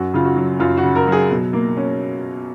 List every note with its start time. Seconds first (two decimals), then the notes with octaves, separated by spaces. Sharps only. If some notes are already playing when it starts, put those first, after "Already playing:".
Already playing: F#2 F#4
0.14 C#3 F4
0.25 F#4
0.36 F#3
0.59 F#2 F4
0.77 F#4
0.83 C#3
0.96 A#4
1.07 F#3
1.12 G#4
1.30 B2
1.53 A#3
1.77 C#4